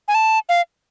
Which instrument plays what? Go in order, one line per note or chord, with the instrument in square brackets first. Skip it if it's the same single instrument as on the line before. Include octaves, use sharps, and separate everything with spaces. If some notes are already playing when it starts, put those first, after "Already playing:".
[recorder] G#5
A5
F5